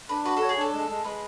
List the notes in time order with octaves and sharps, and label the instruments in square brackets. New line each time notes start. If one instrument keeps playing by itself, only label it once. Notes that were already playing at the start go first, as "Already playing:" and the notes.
[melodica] D4 [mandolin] B4
[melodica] F#4 [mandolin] B4
[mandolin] A4 [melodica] C#5
[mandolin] G#4
[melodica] D4 [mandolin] A4
[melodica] G#3
G#3
[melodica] G#3 [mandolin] B4